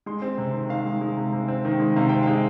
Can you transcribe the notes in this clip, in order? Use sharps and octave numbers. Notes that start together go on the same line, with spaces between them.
G#3 C6
C4
C3
D#3
D#3 F5
G#3
G#3
C3
C3
C4
D#3
G#3
C3 F5
C4 G5
G#3 F5